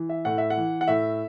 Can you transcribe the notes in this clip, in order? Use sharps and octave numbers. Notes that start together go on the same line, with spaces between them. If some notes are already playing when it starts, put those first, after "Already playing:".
Already playing: E3
E5
A2 F#5
E5
F#5
E3
F#5
A2 E5